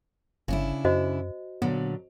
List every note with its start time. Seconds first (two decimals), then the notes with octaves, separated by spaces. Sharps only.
0.48 G1 C#3 D4 E4
0.85 F#2 F#4 C5 D#5
1.62 A#2 D3 F#3 B3